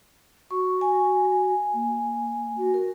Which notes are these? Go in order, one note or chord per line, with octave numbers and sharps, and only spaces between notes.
F#4 C#6
G#5
A#3
F#4
A#4